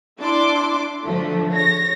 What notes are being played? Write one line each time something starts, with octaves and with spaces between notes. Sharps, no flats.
D4 E4 C6 D6
D3 F3 F#3 A3
C#5 A#6